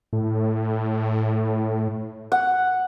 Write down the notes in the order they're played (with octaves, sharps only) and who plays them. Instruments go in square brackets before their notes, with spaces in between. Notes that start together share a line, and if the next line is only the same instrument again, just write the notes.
[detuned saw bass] A2
[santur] F#5